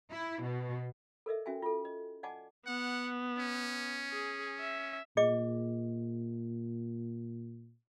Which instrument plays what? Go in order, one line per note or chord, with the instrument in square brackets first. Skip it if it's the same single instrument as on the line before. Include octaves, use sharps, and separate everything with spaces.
[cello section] E4
B2
[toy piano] A4 A#4 D#5 E5
C#4 F#4 E5 G5 G#5
F4 A4
D#5
D5 D#5 F#5 G#5 A5 D6
[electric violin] B3 [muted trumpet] F#5
[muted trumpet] C#4
[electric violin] G#4
E5
[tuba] A#2 [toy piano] G#4 D#5 D6